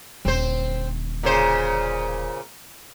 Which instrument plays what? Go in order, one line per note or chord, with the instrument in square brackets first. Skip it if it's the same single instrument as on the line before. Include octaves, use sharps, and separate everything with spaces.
[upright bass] D#1 D3 [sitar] C4 C5
[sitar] A#2 C#3 C5